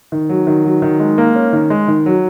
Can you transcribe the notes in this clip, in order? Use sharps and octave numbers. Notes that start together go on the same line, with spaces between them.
D#3
F#3
D#3
F#3
D#3
G#3
A#3
C#4
D#3
G#3
D#3
F#3